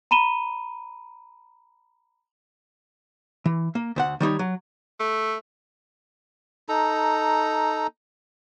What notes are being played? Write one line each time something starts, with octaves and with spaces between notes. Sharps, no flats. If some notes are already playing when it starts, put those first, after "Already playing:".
A#5 B5 D#7 E7 G7
E3
A#3
D2 C5 F#5
D#3 G3 D#4 C#5
F#3
A3
D#4 A4 A#5